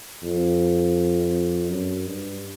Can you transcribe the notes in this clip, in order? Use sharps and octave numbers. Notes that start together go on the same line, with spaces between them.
F2
F#2
G2